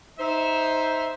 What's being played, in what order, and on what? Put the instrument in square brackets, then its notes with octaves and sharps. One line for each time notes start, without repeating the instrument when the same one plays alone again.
[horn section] D#4 C5 E5